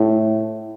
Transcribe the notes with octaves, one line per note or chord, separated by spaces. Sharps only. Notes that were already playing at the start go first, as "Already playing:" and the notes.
Already playing: A2